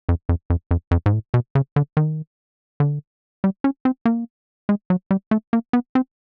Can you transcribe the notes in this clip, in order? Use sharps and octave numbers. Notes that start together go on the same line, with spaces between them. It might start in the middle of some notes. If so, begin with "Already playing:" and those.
F2
F2
F2
F2
F2
G#2
A2
B2
C#3
D3
D#3
D3
G3
C#4
C4
A#3
G#3
F#3
G3
A3
A#3
B3
C4